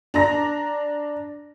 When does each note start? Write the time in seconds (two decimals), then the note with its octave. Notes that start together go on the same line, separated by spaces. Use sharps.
0.14 D4 A#5 A#6